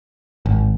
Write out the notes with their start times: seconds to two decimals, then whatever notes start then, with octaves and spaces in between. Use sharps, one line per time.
0.46 G#1